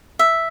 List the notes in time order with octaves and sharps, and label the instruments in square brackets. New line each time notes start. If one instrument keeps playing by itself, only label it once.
[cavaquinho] E5